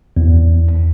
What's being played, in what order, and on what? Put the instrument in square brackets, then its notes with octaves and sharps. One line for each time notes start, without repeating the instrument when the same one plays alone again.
[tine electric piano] E2